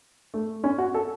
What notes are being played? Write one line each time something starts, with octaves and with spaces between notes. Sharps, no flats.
A3
C#4
F#4
A4